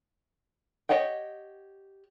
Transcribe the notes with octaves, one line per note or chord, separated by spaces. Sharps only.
G4 C#5 D#5 F#5 G5